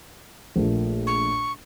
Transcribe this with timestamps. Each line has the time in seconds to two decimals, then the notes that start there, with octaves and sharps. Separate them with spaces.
0.56 A#1 A#2 A3
1.07 C#6